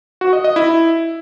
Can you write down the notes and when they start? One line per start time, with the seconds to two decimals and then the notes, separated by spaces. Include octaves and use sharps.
0.21 F#4
0.33 D#5
0.44 D#5
0.56 E4